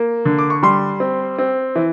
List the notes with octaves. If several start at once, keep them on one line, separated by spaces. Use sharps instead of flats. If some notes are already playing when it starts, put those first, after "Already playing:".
Already playing: A#3
D3
D6
C#6
G3 C6
C4
C4
E3